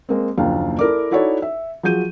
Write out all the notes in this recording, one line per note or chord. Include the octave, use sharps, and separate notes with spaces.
G#3 A#3 C4
F#1 D#2 F3 D4 F5
E4 A4 A#4 D5 D6
D#4 E4 F#4 A4 C#5 D5
E5
F3 F#3 G#4 G6 D#7